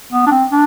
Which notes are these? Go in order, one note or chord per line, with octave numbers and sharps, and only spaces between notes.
B3
D4
C4
D4